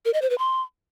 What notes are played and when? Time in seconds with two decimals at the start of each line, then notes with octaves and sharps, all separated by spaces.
0.05 A#4
0.14 D#5
0.22 C5
0.30 B4
0.38 C6